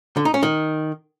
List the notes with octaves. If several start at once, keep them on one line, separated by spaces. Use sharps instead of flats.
D3
D#4
C#4
D#3